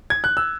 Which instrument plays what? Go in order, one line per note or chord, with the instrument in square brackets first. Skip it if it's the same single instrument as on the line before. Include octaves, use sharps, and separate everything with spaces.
[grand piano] G#6
F#6
E6